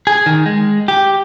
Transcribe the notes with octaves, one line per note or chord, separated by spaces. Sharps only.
G#4
D#3
G#3
G4